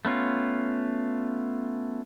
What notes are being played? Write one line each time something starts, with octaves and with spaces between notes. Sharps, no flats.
A3 B3 C#4 F4